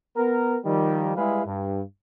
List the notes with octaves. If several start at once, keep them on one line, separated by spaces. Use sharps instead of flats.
B3 A#4
D#3 F3 G3
G3 G#3 E4 G#4 B4 F5
G2